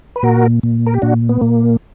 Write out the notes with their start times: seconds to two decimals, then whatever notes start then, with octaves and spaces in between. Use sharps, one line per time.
0.16 B4
0.23 A#2 F#4 A#4
0.63 A#2
0.87 A#4
0.94 G4
1.02 A#2 D4 F#4
1.29 B3
1.41 A#2 A#3